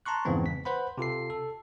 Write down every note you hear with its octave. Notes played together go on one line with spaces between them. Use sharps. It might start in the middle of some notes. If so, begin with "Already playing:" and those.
A5 A#5 C6 C#6 F#6
F2 G#2 C#3 E3 B3 C4
B6
B4 C5 F#5 B5
C3 F4 A4 C7
A4